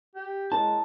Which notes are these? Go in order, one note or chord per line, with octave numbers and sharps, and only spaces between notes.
G4
G#3 E4 A#4 C#5 A5